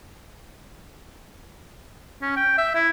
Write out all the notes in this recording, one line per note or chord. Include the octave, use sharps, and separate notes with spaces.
C#4
G5
E5
E4